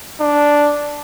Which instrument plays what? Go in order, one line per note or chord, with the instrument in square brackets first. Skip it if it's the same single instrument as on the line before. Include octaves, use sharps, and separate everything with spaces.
[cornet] D4